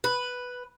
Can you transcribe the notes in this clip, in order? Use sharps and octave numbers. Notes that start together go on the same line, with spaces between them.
B4